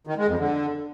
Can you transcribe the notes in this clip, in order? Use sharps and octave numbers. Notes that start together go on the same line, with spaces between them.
D#3
G#3
F2
D3